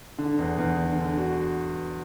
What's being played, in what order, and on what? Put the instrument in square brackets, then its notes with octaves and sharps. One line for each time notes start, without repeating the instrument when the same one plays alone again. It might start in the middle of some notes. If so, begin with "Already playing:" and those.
[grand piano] D3
E2
E2
D3
D3
F#4